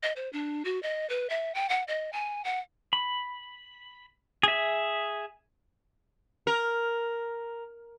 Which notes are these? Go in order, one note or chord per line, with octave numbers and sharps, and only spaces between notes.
D#5
C5
D4
F#4
D#5
B4
E5
G5
F#5
D#5
G#5
F#5
B5
G#4 E5
A#4